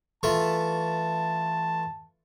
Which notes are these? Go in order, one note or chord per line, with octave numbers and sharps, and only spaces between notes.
E3 A3 F4 A5